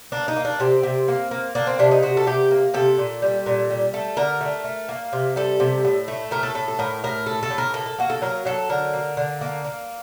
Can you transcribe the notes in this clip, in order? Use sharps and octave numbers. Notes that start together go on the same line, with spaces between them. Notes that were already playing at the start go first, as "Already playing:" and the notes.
A#3 D4
D#4
A#3
D4
C3 C4
C3
A#3
A#3
A#3 D4
C4
C3 D4
D#4
C3 F#4
A4
C3 G4
A#3
C3 A4
A#2
G3
A#2
G3
A3 A4
D3 A#4
A3
A3
A#3
C3
G3 A4
C3
A2
A3
A2 A#4
A4
A2 A4
A4
A2 A#4
A2 A#4
A3 A4
A4
A2
A#4
A#3 A4
A4
A#3 F#4
A4
F#3 A#4
F#3 A4
D3 A#4
A#3
D3
A#3
A#3